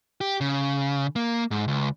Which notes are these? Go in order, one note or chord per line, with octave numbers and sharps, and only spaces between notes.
G4
C#3
A#3
G#2
C#2